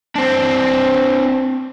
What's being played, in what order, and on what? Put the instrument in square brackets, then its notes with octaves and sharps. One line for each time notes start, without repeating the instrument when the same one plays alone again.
[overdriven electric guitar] C4 D4